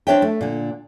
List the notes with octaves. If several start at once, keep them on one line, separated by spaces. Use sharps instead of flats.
C4 D4 G4 C#5 E5 G5
A3
A#2 D3